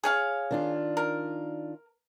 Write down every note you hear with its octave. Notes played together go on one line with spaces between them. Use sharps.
G#4 C#5 F5
D#3 D4 F4
A#4